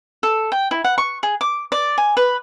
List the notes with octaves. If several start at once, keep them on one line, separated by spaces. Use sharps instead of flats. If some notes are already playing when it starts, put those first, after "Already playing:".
A4
G5
E4
F#5
C#6
G#4
D6
D5
G#5
B4